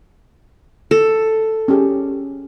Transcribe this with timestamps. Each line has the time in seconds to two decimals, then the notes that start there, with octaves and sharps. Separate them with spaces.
0.91 A4
1.68 C#4 G4 G#4